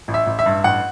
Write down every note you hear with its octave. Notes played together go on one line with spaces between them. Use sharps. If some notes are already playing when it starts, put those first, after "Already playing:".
A1
E5
A1
E5
G2
A1 F#5